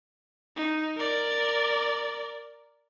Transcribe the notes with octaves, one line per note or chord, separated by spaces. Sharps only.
D#4
A#4 D5